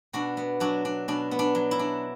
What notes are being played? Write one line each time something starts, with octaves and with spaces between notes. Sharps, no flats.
B2 D4 F#4
B3
F#3 D4 F#4
D4
B2 D4
B3
D4
F#3
E4
D4